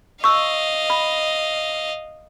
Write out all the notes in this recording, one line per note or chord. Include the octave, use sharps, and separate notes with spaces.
D#5 F5 C#6 E6
B5